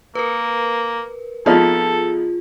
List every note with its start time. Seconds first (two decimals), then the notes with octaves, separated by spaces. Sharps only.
0.15 A#3 A#4 B4
1.46 F3 B3 D#4 F4 G#4 A4